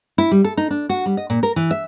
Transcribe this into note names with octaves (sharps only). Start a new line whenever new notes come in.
E4
G3
A4
D#4
D4
F#4
G3
D#5
A#2
A#4
E3
E5